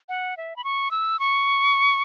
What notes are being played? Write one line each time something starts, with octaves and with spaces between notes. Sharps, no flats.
F#5
E5
B5
C#6
E6
C#6